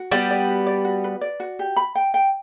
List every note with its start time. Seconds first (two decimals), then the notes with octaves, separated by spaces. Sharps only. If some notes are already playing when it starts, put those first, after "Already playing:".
Already playing: F#4
0.12 G3 B3 D5
0.31 D5
0.48 F#4
0.67 D5
0.85 F#4
1.04 B4
1.21 D5
1.40 F#4
1.59 G4
1.77 B5
1.95 G5
2.14 G5